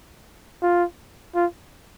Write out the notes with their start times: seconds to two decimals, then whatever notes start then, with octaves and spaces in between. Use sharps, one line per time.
0.62 F4
1.35 F4